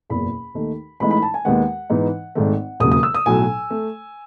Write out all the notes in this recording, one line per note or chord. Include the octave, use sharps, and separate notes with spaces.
F#1 E2 B2 B5
D#2 D#3 A3 D#4
A1 A2 E3 G#3 D#4 B5
B5
A5
G#5
D#2 D#3 G#3 B3 F#5
G#2 E3 B3 D#4
G#1 G#2 D#3 A3
E1 D#2 C#3 F#3 D#6
D#6
E6
D#6
B1 A2 F#3 G#5
A3